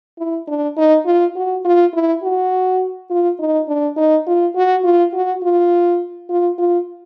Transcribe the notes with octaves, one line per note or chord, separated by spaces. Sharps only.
E4
D4
D#4
F4
F#4
F4
E4
F#4
F4
D#4
D4
D#4
F4
F#4
F4
F#4
F4
F4
F4